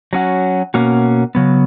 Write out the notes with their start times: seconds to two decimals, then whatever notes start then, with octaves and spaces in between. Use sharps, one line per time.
0.13 F#3 C#4 F#4
0.74 B2 A#3 C#4 F#4
1.35 C#3 F#3 B3